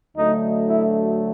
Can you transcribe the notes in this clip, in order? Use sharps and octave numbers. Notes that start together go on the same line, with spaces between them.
D2 D3 F#3 A3 D#4
E4